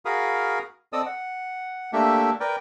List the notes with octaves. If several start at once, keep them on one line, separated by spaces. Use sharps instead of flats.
F#4 G#4 A#4 F5 B5 D#6
C4 A4 D5 D#5 D#6 E6
F#5
A3 A#3 D4 G4 A4 E5
A#4 B4 D5 G5